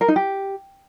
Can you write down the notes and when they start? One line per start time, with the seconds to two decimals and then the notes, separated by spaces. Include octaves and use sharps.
0.01 A#4
0.08 D#4
0.16 G4